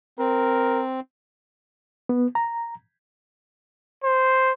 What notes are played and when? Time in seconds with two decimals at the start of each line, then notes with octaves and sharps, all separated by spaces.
0.19 C4 A#4
2.09 B3
2.35 A#5
4.04 C5